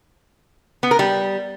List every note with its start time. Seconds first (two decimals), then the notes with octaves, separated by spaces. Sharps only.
0.83 B3
0.91 A#4
0.99 G3